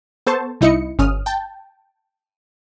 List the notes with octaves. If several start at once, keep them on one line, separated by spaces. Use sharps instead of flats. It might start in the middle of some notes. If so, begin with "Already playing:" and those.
B3 A4 C5 A5 C#6
C2 D#4 E4 D#5 C#7
G1 C#4 D#6 F6
G5 A5